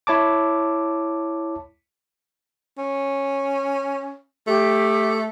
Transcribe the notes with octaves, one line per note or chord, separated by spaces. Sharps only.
E4 C#5 A5 D6
C#4
A3 G4